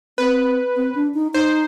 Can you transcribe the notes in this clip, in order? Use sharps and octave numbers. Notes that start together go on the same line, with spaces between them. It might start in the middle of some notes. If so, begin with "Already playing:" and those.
C4 B4
C4
D4
D#4
D#4 C5